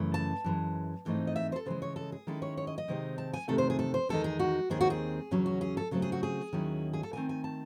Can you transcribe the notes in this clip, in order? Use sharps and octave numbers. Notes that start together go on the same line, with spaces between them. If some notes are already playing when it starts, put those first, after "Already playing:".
Already playing: F#2 C#3 E3 A3
A5
F#2 E3 G#3
G#2 E3 A3 C4 D#4
D#5
E5
C5
A4
C#3 E3 G#3 C5
C#5
A4
G#4
D#3 G#3 C#4 E4 A4
C#5
C#5
D#5
D#5
C3 D#3 G#3 C4 D#4
A5
G#5
E2 C3 D#3 A3 A4
C5
G#4
A4
C5
E2 D#3 G#3 D#4 A4
G#4
F#4
D#2 D#3 G#3 C4 G#4
F#4
G#4
E2 C#3 F#3 C#4
F#4
G#4
A4
C#3 F#3 A3 C4 A4
G#4
F#4
G#4
D#2 D#3 F#3 C#4 E4
G#4
A4
E2 D#3 A3 C4 G#5
G#5
A5